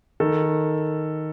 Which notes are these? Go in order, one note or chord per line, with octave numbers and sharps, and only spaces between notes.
D#3 A4